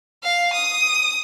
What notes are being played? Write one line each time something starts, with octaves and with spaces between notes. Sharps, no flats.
F5
D#6